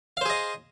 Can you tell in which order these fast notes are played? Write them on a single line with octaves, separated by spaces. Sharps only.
F5 C5 G#4 D#5